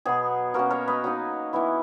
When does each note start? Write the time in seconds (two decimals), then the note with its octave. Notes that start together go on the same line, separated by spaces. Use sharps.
0.05 B2 F#3 B3 G#4
0.54 B2 A#3 C#4 F#4 A#4
0.70 A#4 C#5
0.88 B4 D#5
1.04 F#3 A#3 D#4
1.53 E3 B3 E4